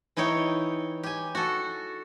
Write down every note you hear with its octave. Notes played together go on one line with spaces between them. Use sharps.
E3 D#4 E4 C#5 G5
G4 G#5
F#4 A4